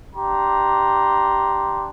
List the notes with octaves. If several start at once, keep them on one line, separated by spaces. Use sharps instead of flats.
D4 G4 A#5 C6